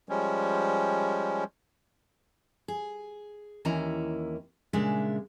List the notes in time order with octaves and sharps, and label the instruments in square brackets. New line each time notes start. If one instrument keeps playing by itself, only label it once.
[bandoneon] F3 G3 G#3 C#4
[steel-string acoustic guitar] G#4
D#2 E3 A#3 C#4 E4 A#5
A#2 C#3 G#3 D4 E5